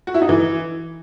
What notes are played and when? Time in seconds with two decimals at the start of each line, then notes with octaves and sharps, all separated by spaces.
0.07 F#4
0.14 E4
0.22 D#4
0.29 E3